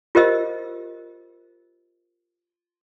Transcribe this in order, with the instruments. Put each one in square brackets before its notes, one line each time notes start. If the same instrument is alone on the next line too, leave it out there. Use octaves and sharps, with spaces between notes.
[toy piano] F4 G4 A#4 C5 D#5 E6